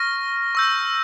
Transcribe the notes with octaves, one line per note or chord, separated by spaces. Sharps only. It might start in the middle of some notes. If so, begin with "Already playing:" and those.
Already playing: C#6 F6 A#6
C#6 E6 G6